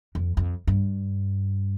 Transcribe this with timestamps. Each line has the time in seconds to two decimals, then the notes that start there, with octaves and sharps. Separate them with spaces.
0.15 F2
0.37 F2
0.67 G2